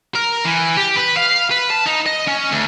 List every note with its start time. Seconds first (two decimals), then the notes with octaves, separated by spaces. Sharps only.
0.15 A#4
0.45 E3
0.77 G4
0.97 B4
1.17 F5
1.51 B4
1.70 A5
1.87 D#4
2.06 D#5
2.28 C#4
2.52 D2